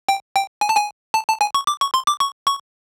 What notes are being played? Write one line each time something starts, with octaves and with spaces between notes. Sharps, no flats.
G5
G5
G#5
A5
G#5
A5
A5
G#5
C#6
D6
C#6
C6
D6
C#6
C#6